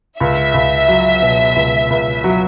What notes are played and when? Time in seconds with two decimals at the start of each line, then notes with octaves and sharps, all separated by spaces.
0.20 C#2 E5
0.54 C#2
0.88 F#3
1.22 B2
1.56 C#2
1.90 C#2
2.24 F#3